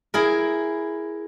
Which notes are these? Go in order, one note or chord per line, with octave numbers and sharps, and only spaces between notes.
E4 G#4 A#4